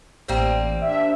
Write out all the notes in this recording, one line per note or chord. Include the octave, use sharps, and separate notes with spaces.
A1 G3 A#3 C4
D4 E5